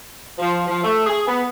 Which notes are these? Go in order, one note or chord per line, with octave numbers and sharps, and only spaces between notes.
F3
F3
A3
G#4
B3